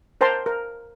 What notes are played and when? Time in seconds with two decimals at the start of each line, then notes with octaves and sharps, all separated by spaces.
0.21 A#4 C5 G5 A5 A#5 C6
0.46 A#4